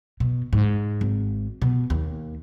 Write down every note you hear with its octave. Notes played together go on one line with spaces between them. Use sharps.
B2
G#2
G#1
B2
D#2